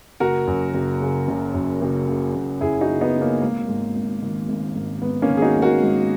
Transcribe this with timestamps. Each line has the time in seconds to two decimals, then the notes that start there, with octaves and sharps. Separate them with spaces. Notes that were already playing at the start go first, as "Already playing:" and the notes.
0.20 F#1 F#4 A#4
0.47 F#2
0.74 F#1
1.01 C#3
1.28 F#1
1.54 F#2
1.81 F#1
2.08 C#3
2.35 F#1
2.61 F#2 E4 G#4
2.81 D#4 F#4
2.89 F#1
3.01 B3 D#4
3.14 C#3
3.21 A#3 C#4
3.41 G#1 A#3
3.68 G#2
3.95 G#1
4.23 D#3
4.48 G#1
4.75 G#2
5.02 G#1 B3
5.22 A#3 C#4
5.29 D#3
5.37 G#4
5.42 D#4 F#4
5.56 G#1
5.62 F#4 A#4
5.83 G#2